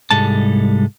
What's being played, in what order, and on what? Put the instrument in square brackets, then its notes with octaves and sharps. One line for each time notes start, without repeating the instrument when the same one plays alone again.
[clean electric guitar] C2 G#2 G3 G#3 A4 A5